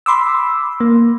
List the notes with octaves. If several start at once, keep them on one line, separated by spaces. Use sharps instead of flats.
B5 C6 D6 E6
A#3